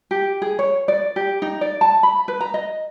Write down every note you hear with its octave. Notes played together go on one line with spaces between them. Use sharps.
G4
G#4
C#5
D5
G4
D#4
D5
A5
B5
B4
A#5
D#5